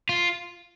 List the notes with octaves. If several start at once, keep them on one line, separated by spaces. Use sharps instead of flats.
F4